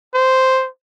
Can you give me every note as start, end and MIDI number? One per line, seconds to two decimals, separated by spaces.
0.14 0.68 72